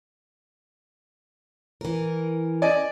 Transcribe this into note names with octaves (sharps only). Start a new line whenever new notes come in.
E3 A#4
D5 D#5 G#5